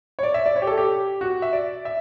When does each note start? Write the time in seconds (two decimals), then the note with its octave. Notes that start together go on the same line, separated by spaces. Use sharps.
0.19 C#5
0.23 D5
0.34 E5
0.46 D5
0.56 C#5
0.62 G4
0.67 A4
0.77 G4
1.21 F#4
1.42 E5
1.53 D5
1.85 E5